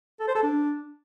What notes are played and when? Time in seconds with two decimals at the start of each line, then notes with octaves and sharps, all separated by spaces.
0.20 A4
0.28 C5
0.35 A4
0.43 D4